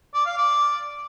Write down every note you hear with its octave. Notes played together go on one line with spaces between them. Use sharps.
D5
F5
D5